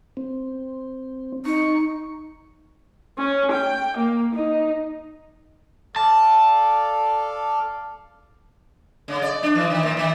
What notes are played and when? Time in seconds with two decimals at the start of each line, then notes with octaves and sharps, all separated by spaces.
0.17 C4
1.45 D#4 C#6
3.18 C#4
3.52 G5
3.97 A#3
4.35 D#4
5.96 A4 D5 F5 A5
9.08 C#3
9.22 D5
9.43 D4
9.55 E3
9.70 D#3
9.83 A#2
9.97 D#3